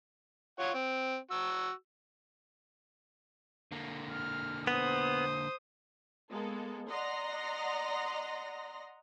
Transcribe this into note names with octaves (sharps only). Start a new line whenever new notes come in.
F4 C#5 F#5
C4
F#4 E6
D3 A#3
F6
B3 C5 D#6
G#3 A#3 B3 A4
D5 D#5 F#5 A#5 C6 A#6